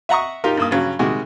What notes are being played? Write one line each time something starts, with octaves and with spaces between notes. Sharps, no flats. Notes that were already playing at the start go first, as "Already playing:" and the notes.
E5 F#5 A#5 C#6 D#6
D#4 F4 G4 A#4
G2 A#3 D#6
G2 C#3 F#3
C3 D#3 G3 G#3 F#4